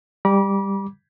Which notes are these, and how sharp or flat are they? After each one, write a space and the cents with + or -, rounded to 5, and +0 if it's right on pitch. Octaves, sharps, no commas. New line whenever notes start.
G3 +15 B5 -40 D6 -15